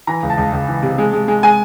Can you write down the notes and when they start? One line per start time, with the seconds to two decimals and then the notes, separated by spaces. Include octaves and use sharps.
0.07 E3 A#5
0.23 C#2
0.30 A5
0.38 C#2
0.53 C#2
0.68 E3
0.83 C3
0.98 G#3
1.13 G#3
1.28 G#3
1.43 G#3 G#5